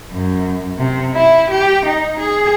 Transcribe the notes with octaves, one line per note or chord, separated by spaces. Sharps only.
F#2
C3
E4
G4
D#4
G#4